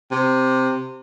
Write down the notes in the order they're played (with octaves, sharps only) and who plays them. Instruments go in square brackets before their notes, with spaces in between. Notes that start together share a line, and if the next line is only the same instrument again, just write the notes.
[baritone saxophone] C3